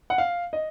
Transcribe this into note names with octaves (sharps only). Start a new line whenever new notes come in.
F#5
F5
D#5